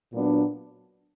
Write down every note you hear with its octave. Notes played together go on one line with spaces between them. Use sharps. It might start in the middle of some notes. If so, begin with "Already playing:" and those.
A#2 F#3 B3 D4